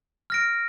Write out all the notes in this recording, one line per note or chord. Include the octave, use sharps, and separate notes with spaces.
F6 A#6 D7